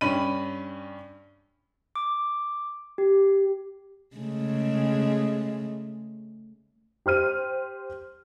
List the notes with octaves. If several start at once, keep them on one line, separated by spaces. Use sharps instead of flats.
G2 C#4 B5 D#7
D6
G4
C#3 G#3 A3
G4 C5 F6 D#7